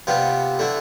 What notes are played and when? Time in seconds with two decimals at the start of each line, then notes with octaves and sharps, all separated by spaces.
0.07 C3 G3 B3 F4
0.59 D3 A3 E4